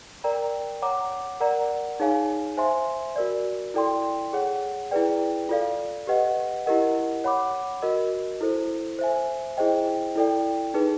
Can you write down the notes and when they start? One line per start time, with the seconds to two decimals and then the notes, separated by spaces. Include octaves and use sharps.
0.24 A#4 D5 G5 A#5
0.82 C#5 F#5 A#5 D6
1.40 A#4 D5 F#5 A#5
2.00 D#4 G#4 C#5 F5 G#5
2.57 C5 E5 G#5 C6
3.16 F#4 A#4 D5
3.74 E4 A4 D5 G5 C6
4.33 G#4 C#5 F#5
4.91 E4 G#4 B4 D5 G5
5.49 F4 A4 D5 F5
6.07 G4 B4 D#5 F#5
6.66 E4 G4 A#4 D#5 F#5
7.24 C#5 F#5 B5 D6
7.82 F#4 A#4 D#5
8.41 E4 A4 C5
8.99 C5 E5 G#5
9.57 E4 G#4 C5 D#5 G5
10.16 E4 A4 D5 G5
10.74 D#4 G#4 B4